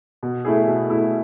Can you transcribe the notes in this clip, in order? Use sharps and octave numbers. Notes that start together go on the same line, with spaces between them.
B2
A3 E4 G#4
B2
A3 E4 G#4